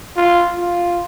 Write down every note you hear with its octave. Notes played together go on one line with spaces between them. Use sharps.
F4
F4